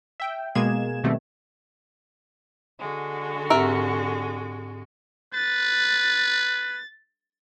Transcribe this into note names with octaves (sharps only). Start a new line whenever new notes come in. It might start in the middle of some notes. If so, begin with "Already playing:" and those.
E5 G5
B2 G#3 A#3 G#4 G#6 E7
B2 D#3 G3 A3 C4
D3 G#3 F#4
G#2 C4 G4 A#4 E5 F#5
B4 A6